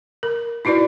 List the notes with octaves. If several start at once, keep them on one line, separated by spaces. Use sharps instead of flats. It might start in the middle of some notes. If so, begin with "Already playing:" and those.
A#4
D#4 E4 F#4 B4 D5